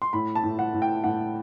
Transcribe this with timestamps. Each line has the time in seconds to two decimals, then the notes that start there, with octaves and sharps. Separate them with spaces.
0.02 C6
0.13 A2 B5
0.35 A5
0.43 A2
0.59 F#5
0.74 A2
0.82 G5
1.04 A2 F#5